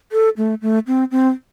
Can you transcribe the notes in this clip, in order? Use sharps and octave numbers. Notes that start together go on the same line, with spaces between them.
A4
A3
A3
C4
C4